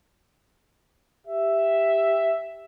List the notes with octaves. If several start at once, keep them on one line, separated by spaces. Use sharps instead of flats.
G4 E5